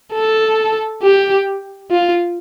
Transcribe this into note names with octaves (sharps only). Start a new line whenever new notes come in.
A4
G4
F4